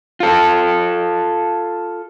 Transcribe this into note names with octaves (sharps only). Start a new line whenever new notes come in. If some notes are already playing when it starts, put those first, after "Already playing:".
F4 A4